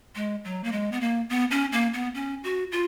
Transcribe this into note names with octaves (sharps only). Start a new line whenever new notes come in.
G#3
F#3
A#3
G#3
B3
A#3
B3
C#4
A#3
B3
C#4
F#4
F4